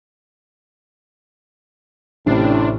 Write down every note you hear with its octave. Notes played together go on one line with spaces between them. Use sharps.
A1 A2 C3 A3 C#4 D4 E4 C7